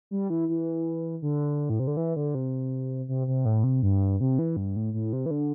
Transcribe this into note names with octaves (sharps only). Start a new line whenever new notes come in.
G3
E3
E3
D3
A2
C3
D3
E3
D3
C3
C3
C3
A2
C3
G2
C3
E3
G2
A2
A2
C3
E3
D3